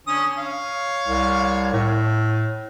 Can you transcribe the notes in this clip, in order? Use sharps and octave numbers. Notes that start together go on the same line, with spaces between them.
D3 C#4 D#6
C#5 F5
C2
A2